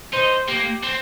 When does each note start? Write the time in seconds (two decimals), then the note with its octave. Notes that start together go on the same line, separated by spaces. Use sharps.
0.13 D#4 C5
0.48 A#3 G4
0.83 C4